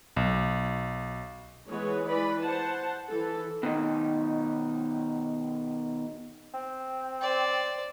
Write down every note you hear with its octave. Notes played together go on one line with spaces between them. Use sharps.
B1
E3 G#3 B3 B4 C#5
E3 B4 D5 B5
C5 F#5 A5
E3 A4
B2 D#3 D#4
C4
C5 D5